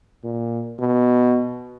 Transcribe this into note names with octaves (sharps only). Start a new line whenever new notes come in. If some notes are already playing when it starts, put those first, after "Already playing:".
A#2
B2